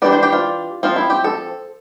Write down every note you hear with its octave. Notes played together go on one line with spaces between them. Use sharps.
E3 G3 D4 D5
C5
G4
F4
F3 C4 F4
E4
G4
A4